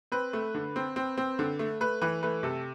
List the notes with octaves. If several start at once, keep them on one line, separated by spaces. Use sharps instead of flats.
C4 B4
A3
D3
C4
C4
C4
D3
A3
A3 B4
E3 B4
A3 B4
C3 A4